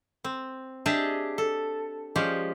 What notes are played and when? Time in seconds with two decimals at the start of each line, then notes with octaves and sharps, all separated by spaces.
0.24 C4
0.86 D4 G4 G#4 D#5 E5 A5
1.38 A4
2.16 F3 G#3 C#4 G4 D5